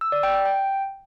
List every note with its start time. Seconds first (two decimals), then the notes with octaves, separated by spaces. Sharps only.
0.01 E6
0.12 D5
0.23 G5
0.34 G5
0.45 G5